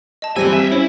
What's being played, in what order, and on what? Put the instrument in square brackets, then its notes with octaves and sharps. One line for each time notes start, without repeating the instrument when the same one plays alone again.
[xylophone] D#5 A5
[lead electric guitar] E3 G#5 [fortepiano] G3 C4 [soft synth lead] C5 [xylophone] E6 A#6 D#7
[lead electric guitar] E5 F5
[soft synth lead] C#4 [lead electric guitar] E4 [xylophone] C5 C#5